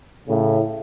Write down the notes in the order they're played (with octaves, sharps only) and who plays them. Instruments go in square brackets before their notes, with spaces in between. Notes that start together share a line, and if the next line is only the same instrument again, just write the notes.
[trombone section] A2 C#3